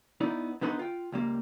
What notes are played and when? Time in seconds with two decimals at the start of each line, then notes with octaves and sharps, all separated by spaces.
0.21 B3 D#4 E4 D5
0.61 D3 B3 D#4 B4 B5 C6
0.79 F4 G5
1.12 C#2 G3 A#3